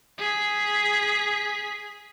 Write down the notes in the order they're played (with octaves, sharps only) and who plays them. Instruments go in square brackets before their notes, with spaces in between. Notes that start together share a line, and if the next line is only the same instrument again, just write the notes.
[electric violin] G#4 B6